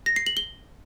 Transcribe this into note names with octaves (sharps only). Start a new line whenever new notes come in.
A#6
C7
F#7
G7